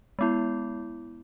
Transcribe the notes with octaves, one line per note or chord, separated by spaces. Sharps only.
G#3 B3 E4